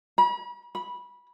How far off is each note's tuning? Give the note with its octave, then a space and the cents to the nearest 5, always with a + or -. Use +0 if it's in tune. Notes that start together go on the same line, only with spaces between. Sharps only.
B5 -40
B5 -15